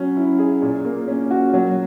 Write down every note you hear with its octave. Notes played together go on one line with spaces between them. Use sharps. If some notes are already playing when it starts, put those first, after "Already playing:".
Already playing: F#3 C#4
E4
G#4
A#2
A#3
C#4
F#4
F#3